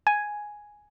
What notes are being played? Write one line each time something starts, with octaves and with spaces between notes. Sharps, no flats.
G#5